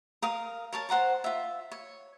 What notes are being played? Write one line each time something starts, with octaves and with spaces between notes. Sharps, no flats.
A#4 F5 D#6
A#4 C#5 A5
C5 F#5 A#5 C#6
F4 E5
C#5